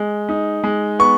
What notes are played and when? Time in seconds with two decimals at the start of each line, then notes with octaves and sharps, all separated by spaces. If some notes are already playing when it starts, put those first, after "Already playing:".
Already playing: G#3
0.29 D#4
0.64 G#3
0.99 B3 C#6